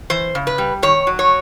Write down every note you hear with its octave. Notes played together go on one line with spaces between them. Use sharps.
E3 C5
C#3
B4
G3
D#3 C#5
F#3
C#5